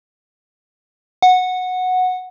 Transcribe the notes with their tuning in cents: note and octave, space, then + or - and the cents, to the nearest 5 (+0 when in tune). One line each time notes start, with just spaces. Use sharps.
F#5 -10